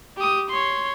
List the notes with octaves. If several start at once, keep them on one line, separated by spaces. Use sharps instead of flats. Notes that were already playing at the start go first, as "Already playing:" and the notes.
G4 D#6
C#5 C6